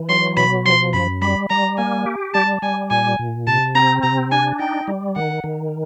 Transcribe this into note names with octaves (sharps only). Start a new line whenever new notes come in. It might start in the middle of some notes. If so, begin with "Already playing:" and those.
Already playing: E3
F#3 C6
B2 B5
F3 C6
F#2 B5
G3 B5
G3 A#5
A#3 G#5
G4
G3 A5
G3 G#5
A#2 G#5
A#2
C3 A5
C4 A#5
C3 A#5
D4 G#5
D#4 G5
G3
D#3 F#5
D#3